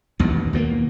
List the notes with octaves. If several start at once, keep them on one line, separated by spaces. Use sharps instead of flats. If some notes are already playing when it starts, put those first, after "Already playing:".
A1 D#2 B2
D#2 B2 F3 A#3